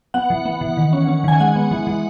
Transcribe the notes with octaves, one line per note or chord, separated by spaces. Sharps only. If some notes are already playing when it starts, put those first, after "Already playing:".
B3 F#5
E3
B3
E3
D#3
C#4
C#4
D#3 G#5
G#3 F#5
B3
E3
E3